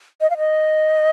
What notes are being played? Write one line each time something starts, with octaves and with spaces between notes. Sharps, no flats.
D#5
F5
D#5